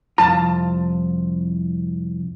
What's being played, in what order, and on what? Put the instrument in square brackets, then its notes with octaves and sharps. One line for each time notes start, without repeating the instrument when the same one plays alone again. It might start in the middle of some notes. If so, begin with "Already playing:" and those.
[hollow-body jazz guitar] C2 F2 F4 [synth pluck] A5